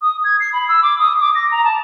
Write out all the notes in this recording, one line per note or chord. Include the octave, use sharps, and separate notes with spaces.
D#6
G#6
C7
B5
E6
D6
D#6
D6
A#6
A#5
A5